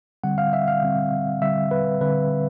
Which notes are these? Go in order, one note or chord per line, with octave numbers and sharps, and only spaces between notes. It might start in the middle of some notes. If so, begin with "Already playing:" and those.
D3 G3 C4 F#5
F5
E5
F5
D3 G3 C4
D3 G3 C4 E5
B4
D3 G3 C4 B4